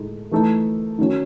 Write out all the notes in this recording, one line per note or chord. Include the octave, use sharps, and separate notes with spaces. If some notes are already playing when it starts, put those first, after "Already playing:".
Already playing: A2 G#3 D#4 A4
E3 A3 D#4 A4
D#3 F#3 C#4